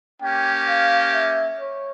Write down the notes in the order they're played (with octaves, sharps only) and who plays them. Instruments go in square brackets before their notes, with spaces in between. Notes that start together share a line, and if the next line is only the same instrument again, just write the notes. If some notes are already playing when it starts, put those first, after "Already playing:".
[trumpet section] A#3 C#4 G4 [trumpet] G5
[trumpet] F5
E5
C#5